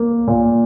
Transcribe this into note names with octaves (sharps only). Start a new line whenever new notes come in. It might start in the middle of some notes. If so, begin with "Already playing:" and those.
Already playing: A#3
A#2